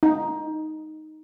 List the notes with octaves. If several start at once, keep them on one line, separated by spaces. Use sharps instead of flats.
D#4